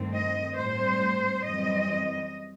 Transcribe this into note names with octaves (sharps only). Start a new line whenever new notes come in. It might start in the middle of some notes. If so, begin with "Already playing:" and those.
Already playing: G2 D#3 A3 C4
D#5
A2 G3 C4 C5
F#2 E3 G3 C4 D#5